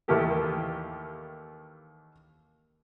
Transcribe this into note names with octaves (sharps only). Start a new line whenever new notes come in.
D#2 D#3 E3 A#3 G4 A4